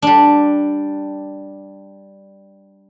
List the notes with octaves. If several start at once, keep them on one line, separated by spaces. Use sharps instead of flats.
G3 D4